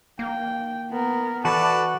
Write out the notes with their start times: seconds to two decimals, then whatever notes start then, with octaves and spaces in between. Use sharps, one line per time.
0.19 A#3 G5
0.90 B3 A#4
1.45 E3 F#4 A4 B4 D5 A5